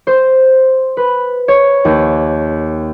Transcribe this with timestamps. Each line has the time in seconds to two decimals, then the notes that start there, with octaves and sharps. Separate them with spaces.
0.07 C5
0.97 B4
1.48 C#5
1.85 D#2